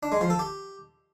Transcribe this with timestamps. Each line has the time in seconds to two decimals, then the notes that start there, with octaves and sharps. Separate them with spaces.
0.03 D4
0.12 G#3
0.21 F3
0.30 A4
0.39 G4